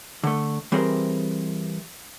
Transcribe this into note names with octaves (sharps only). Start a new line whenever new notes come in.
D3 A3
E3 G3 C4 G#4 A#4 C5